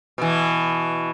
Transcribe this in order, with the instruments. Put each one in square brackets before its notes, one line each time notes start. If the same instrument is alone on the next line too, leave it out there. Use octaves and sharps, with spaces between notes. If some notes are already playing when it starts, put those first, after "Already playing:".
[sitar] B2 E3